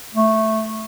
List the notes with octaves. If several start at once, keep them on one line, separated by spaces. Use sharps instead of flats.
A3